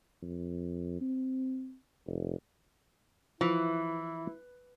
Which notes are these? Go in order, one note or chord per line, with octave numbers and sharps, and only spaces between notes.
F2
C4
F1
E3 F3 E4